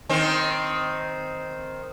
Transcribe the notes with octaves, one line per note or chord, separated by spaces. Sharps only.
D#3 C4